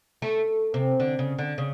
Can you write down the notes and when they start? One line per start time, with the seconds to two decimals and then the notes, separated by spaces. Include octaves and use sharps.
0.22 A3
0.74 C3
1.00 D3
1.19 C#3
1.39 D3
1.58 C#3